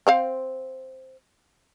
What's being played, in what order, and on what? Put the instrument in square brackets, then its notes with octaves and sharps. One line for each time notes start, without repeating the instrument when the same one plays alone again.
[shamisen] C4 C5 F5